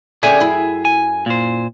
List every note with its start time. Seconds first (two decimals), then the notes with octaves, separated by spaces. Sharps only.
0.23 D3 C#4 G4 G#4 E5 G#5
0.40 F#2 E4
0.85 G#5
1.26 A#2 C5